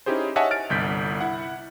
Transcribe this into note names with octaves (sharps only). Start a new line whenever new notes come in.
C#4 D#4 E4 G4 G#4 C5
C#5 D#5 E5 F#5 G#5 A5
F6 A6 D7
G1 C2 G6 B6
E4 F#5